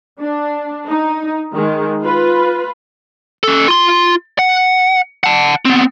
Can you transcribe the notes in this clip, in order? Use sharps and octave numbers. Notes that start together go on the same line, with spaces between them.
D4
D#4
D#3 G#3
F4 B4
C#4 A4
F4 C6
F#5
F#5 A5
B3 C4